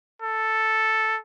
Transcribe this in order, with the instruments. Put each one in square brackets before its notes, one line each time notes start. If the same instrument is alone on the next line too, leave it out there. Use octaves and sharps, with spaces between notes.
[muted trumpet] A4